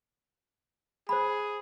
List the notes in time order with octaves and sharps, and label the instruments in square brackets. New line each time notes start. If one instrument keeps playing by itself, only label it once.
[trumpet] G#4 [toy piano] C5 B5